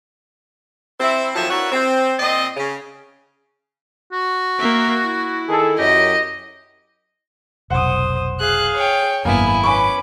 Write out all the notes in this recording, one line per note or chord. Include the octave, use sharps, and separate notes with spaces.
C4 E4
D#2 F3 F#3 C4 A4 E5
D4 E4 F#4 A#4 B4 C#5
C4
A#2 C4 D5 D#5
C#3
F#4
A#3 E5
E4
D#3 G#4 A4
F#2 G4 D#5
F1 B1 C5 F#5 D#6
G#4 F5 F#6
C#5 G5
G#1 F#2 A#3 B3 E4 G#5
C#4 B4 G#5 B5 C#6 D6